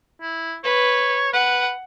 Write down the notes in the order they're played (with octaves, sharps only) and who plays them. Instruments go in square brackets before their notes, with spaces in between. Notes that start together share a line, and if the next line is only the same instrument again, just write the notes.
[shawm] E4
[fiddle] B4 [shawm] C#5
[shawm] B4 [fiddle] F#5